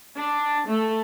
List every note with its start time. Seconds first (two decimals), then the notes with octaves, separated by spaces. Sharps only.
0.17 D4
0.67 A3